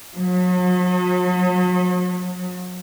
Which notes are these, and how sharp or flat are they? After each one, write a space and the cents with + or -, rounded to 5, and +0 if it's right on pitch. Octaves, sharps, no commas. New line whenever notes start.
F#3 -40